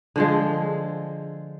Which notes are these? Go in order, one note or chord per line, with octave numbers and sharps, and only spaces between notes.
D3 F3 G#3